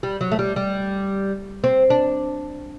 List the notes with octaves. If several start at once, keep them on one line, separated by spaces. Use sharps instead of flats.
G3
F#3
A3
G3
G3
C4
D4